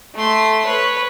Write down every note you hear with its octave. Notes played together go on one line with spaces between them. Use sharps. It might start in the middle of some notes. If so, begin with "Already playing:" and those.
A3 C6
B4 C#5